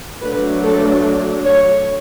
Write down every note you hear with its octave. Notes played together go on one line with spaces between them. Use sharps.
F#3 A3 D4 B4
A4
C#5